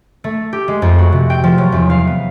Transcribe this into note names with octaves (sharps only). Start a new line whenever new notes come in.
A3
G4
G#3
F2
F#4
C3
G5
F3
F#3
E2
F5
B3